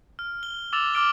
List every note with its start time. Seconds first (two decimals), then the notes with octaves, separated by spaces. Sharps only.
0.19 F6
0.43 G7
0.73 D6 E6 A6 F7
0.94 D6 F6 D7 G7